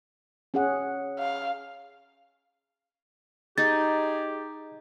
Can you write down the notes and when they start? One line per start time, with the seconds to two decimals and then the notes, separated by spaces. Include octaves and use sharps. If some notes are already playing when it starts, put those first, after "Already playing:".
0.54 C#4 G#4 F#5
1.19 F5
3.58 D#4 G4 G#4 A6